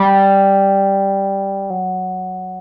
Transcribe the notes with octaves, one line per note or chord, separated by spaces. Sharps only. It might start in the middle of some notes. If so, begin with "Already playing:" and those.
Already playing: G3
F#3